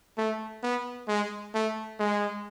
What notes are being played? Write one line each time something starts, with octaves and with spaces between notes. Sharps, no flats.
A3
B3
G#3
A3
G#3